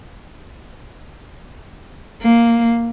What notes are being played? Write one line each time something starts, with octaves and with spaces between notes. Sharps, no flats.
A#3